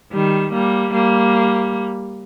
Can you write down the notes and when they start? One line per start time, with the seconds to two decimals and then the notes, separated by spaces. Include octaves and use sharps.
0.12 D#3 G3
0.53 G3 A#3
0.93 G3 A#3